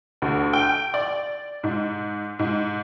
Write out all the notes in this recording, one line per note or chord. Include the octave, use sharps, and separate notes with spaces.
D2
G5
D5
G#2
G#2